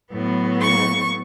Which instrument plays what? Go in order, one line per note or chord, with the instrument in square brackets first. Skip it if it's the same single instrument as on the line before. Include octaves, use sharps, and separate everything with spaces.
[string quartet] A2 F#3 B3
C#6